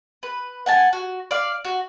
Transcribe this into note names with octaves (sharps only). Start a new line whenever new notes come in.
B4
F#5 G#5 A5
F#4
D5 F5
F#4